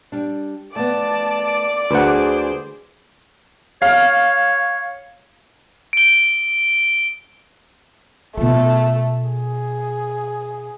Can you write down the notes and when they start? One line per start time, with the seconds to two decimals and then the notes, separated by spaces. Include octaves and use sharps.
0.12 G3 D4
0.76 A3 B3 D5 A5 D6
1.91 D2 G#4 B4 C5 F#5
3.82 C#5 F5
5.93 D7 G7
8.37 B2 A3 F4 A4
9.30 G#4